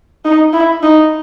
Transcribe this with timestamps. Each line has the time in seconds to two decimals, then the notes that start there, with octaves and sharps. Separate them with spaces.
0.25 D#4
0.53 E4
0.83 D#4